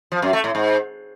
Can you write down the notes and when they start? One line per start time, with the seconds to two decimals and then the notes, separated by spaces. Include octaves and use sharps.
0.12 F3
0.22 F#2
0.33 A3
0.44 A2
0.55 G#2